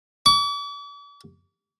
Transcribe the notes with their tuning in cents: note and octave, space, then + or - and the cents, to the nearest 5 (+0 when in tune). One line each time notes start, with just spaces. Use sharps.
D6 -45